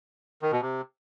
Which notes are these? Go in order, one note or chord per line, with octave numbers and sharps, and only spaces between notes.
D#3
B2
C3